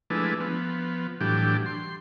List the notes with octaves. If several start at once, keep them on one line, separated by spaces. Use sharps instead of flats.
F3 G#3 A3 D4 E4 B4
F3 B3
A2 E3 F#3 G3 D4 G4
C6